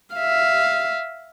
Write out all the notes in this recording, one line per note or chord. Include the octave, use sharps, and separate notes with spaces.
E5 F5